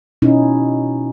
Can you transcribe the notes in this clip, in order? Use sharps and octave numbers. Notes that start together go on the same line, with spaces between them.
B2 C#4 D#4 E4